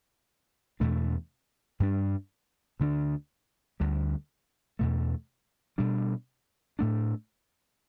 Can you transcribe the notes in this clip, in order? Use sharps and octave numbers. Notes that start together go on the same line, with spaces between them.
E2 B2 A3 D4
G2 G3 B3 D4
D2 D3 B3 D4
D2 D3 G3
E2 B2 A3
B2 G3 D4
A2 A3 D4